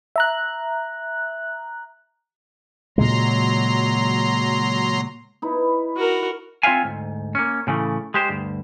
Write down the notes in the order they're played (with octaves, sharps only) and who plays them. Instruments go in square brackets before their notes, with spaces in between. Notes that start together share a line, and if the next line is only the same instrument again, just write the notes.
[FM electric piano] E5 A#5 F#6
[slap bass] A#2 C#3 G#3 [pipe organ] F#3 A#5 C6
[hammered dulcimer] D#4 E4 B4
[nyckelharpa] F#4 A#4
[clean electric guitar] C4 F4 C#5 E5 F5 G#5
D2 G#2
A#3 C#4
A2 C#3 E3 A3
G#3 G4 C5
D2 G2